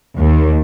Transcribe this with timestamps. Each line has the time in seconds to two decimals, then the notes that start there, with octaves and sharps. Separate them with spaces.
0.19 D#2